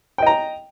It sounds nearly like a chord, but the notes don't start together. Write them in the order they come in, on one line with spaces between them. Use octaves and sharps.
G5 D#5 A#5